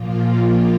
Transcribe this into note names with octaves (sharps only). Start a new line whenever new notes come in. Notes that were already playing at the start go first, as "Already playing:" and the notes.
Already playing: A#2 F3 A#3 F4